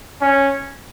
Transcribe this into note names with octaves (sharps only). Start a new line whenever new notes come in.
C#4